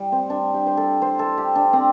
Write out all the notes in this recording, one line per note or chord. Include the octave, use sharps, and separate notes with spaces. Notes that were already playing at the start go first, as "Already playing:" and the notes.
Already playing: G3
C4
D4
G4
C5
A4
C5
A4
G4
D4
C4